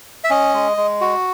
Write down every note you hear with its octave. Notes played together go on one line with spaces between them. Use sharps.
E5
C#4 D#5
G#3
G#3
F#4